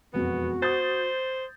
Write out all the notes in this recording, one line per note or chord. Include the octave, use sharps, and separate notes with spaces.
E1 F2 B3 F#4
C5 D#6 G6 A6